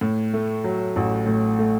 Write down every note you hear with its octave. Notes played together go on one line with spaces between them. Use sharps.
A2
A3
F#3
A1
A2
A3